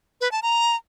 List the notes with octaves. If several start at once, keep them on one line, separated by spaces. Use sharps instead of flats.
B4
A5
A#5